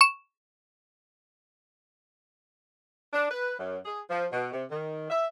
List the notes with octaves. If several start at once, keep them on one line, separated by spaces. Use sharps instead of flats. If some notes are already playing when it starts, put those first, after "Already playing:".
C#6 E7
D4
B4
F#2
G#4
F3
B2
C3
D#3
E5